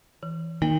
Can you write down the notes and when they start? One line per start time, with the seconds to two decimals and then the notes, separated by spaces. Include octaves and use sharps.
0.23 E3
0.62 D#3 A#3